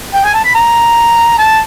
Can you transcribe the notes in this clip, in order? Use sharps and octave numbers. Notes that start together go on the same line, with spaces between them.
G5
G#5
A5
B5
A#5
A5